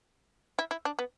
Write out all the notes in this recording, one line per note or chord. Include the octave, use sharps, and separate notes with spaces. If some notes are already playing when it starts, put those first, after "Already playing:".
E4
E4
D4
B3